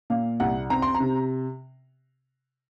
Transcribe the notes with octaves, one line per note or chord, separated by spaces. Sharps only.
A#2 F5
C2 F#5
C4 A#5
C6
A#5
C3